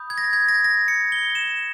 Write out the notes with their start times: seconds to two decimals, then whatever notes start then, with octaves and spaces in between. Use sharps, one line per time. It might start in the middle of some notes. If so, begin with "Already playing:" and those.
Already playing: B5 D#6 G6
0.10 G#6
0.18 A#6
0.33 G#6
0.49 A#6
0.64 A#6
0.88 C#7
1.12 G7
1.35 E7